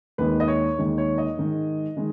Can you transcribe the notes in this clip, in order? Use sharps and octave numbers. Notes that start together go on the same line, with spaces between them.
D#2 D#3 G#3 B4
D#5
C#5
D#2 D#3 G#3
C#5
D#5
G#2 D#3 G#3
D#3 G#3